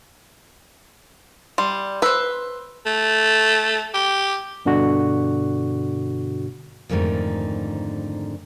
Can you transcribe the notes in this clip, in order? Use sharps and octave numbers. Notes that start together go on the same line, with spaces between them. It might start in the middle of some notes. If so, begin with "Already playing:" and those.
G3 C6
B4 C5 E6
A3
G4
G2 B2 D3 D4 F#4
F2 G#2 D3 D#3 A3